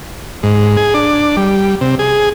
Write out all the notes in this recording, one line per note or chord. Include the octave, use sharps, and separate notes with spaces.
G#2
G#4
D4
G3
C3
G#4